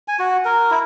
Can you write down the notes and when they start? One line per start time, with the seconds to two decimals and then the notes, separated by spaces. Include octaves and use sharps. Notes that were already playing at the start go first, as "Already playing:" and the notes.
0.08 G#5
0.19 F#4
0.45 A#4
0.71 E4